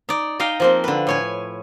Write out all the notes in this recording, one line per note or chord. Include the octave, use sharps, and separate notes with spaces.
D#4 D5
D#4 D#5 F5 G5
F3 A#3 C4
D3 B4
A2 C#5 G#5